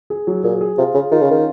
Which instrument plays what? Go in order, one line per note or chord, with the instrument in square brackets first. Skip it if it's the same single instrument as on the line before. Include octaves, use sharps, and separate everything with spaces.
[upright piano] G#4
F#3
[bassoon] A#2 [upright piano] G#4
[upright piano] G#4
[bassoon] C3 [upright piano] F4
[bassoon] C#3 [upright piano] G#4
[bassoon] D#3 [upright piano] F4
[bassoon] C#3
[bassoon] D#3 [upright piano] C#4